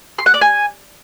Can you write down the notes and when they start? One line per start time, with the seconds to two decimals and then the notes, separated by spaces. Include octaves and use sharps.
0.18 C6
0.26 F#5
0.34 D5
0.42 G#5